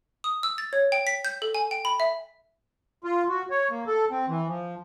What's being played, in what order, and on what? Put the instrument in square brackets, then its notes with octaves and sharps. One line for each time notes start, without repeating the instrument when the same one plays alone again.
[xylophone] D#6
E6
A6
C#5
G5
B6
G6
A4
G#5
G5
B5
E5
[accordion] F4
F#4
C#5
A#3
A4
C4
E3
F3